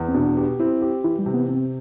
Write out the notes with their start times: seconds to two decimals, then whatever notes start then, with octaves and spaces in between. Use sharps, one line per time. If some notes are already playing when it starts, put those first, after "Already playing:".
Already playing: E2
0.08 C4
0.14 B2 D4
0.37 G4
0.59 C4 E4
0.81 G4
1.04 E3 E4
1.19 G3
1.26 C3
1.34 B3
1.48 C3 C4